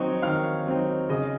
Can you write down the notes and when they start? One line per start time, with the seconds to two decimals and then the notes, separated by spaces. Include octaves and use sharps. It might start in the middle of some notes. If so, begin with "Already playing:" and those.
Already playing: D#3 F#3 C4 D#4 C#5 C#6
0.22 D#3 F5 F6
0.66 F#3 C4 D#4
1.09 C#3 D#5 D#6